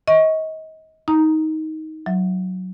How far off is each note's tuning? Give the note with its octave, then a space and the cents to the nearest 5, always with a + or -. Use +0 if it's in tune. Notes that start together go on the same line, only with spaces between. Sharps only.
D#5 +30 C#6 +0
D#4 +15 A#5 +0
F#3 +0 E5 +0